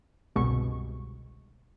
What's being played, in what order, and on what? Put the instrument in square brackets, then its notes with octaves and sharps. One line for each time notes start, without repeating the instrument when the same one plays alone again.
[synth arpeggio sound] G1 C2 B2 G#3 C#6